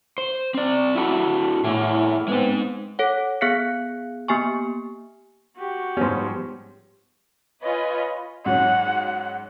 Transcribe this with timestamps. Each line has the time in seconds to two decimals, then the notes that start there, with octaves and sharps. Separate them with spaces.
0.18 C5
0.54 C4 D5
0.95 E4 F#4 A4
1.64 A2 E4 G#4
2.28 G#3 B3 C4 D#4
2.99 A4 C#5 F#5
3.41 B3 G#4 F5 F#6 B6 C#7
4.28 A#3 B3 G4 G#5 C#6
5.56 F#4 G4
5.97 G#2 F3 G3 B3 C#4 C5
7.63 F4 B4 C#5 D#5 G#5
8.46 G#2 F#3 C#4 F#5